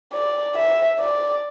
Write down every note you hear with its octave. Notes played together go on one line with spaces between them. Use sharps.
D5
E5
D5